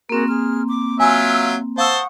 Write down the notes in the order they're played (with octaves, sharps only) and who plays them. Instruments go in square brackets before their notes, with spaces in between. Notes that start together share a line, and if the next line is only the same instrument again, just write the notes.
[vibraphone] A#3 C4 [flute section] F#4 G#4 A#4
[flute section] G#4 F6
D6
[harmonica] F#3 F4 E5 [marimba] G#5 [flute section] E6
[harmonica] C5 A5 [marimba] F5 E6 [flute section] F#5 C#6 D#6